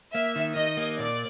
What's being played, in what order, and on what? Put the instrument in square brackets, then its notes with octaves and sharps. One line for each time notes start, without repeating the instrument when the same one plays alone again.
[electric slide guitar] A#3 [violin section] E5
[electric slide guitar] D#3
[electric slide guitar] D#3 [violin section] D#5
[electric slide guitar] A#3
[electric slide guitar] A#2 [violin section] D5